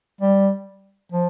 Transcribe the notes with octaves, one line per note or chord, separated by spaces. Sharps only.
G3
F3